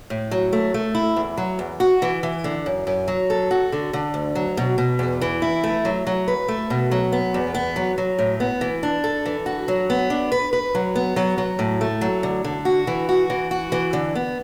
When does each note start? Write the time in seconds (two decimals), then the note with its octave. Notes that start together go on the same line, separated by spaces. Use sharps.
0.10 A2
0.31 F#3
0.53 A3
0.74 A3
0.95 E4
1.16 E2
1.37 F#3
1.59 E2
1.80 F#4
2.02 E3
2.23 E3
2.44 D3
2.66 F#2
2.87 F#2
3.08 F#3
3.30 A4
3.51 F#4
3.72 D3
3.93 D3
4.14 D2
4.35 F#3
4.57 B2
4.78 B2
4.99 E2
5.21 E3
5.42 E4
5.64 A3
5.85 F#3
6.07 F#3
6.28 B4
6.48 A3
6.70 B2
6.91 F#3
7.12 B3
7.34 E2
7.54 B3
7.76 F#3
7.98 F#3
8.18 A2
8.40 B3
8.61 E3
8.83 D4
9.04 A4
9.26 E3
9.46 F#4
9.68 F#3
9.90 B3
10.10 D4
10.32 B4
10.53 B4
10.75 F#3
10.95 B3
11.16 F#3
11.38 F#3
11.59 A2
11.81 A3
12.01 F#3
12.23 D3
12.44 D3
12.65 F#4
12.87 E3
13.09 F#4
13.30 E3
13.51 F#4
13.72 E3
13.93 D3
14.15 B3